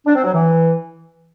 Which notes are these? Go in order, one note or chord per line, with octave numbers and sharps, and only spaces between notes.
D4
C4
F#3
E3